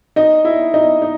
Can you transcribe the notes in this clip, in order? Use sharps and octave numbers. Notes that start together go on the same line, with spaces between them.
D#4 D#5
E4 E5
D#4 D#5
D#4